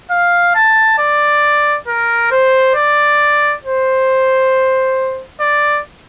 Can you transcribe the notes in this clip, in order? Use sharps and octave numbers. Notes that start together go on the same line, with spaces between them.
F5
A5
D5
A#4
C5
D5
C5
D5